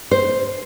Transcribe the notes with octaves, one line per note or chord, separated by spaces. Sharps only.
C5